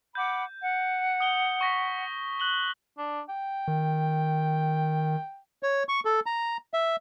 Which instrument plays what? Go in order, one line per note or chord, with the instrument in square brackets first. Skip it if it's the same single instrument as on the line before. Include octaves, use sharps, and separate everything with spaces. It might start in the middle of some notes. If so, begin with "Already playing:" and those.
[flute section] F#5 B5 D6 [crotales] G6
[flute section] F#5
[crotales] D#6 G7
C#6 A#6 B6
F#6 F#7 G7
[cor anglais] D4
G5
[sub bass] D#3
[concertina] C#5
C#6
A4
A#5
E5